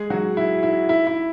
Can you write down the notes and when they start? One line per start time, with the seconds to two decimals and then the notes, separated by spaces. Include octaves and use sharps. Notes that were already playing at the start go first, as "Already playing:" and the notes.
Already playing: G#3 G#4
0.10 F#3 F#4
0.37 E4
0.63 E4
0.89 E4
1.07 E4